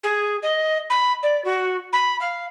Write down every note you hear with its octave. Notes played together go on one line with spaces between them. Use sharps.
G#4
D#5
B5
D5
F#4
B5
F5